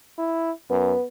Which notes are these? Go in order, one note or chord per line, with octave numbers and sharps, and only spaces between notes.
E4
F#2 B3